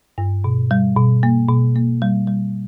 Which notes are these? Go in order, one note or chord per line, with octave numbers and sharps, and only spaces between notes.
G2
B2
G3
B2
A#3
B2
A#3
G3
G3